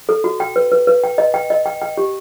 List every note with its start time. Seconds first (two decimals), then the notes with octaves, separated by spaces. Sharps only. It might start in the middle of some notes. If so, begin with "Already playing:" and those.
0.09 A4
0.24 F#4
0.40 G5
0.56 B4
0.72 B4
0.87 B4
1.04 G5
1.18 D#5
1.34 G5
1.50 D#5
1.66 G5
1.82 G5
1.97 G4